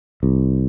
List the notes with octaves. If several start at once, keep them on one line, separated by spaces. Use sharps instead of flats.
C2